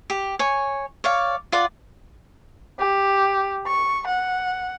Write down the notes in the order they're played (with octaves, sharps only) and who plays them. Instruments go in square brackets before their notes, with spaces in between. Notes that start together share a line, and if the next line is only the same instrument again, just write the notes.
[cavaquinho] G4
C#5 G#5
C#5 D5 F5
F4 D5 F#5
[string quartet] G4
C#6
F#5